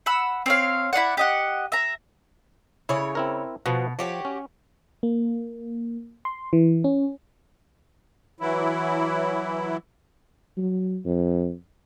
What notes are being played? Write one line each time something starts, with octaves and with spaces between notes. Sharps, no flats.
F#5 B5 E6
C4 C#5 F5
E4 F4 D5 F#5
G4 D#5 F#5
E5 A#5
C#3 E4 G#4 C#5
C4 E4 A#4
B2 F3 B3 F#4
F3 F#4 G4 C#5
C#4
A#3
C6
E3
C#4
E3 F#3 E4
F#3
F2